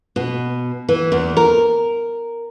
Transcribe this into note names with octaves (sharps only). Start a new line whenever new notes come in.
B2
E3
E2
A#4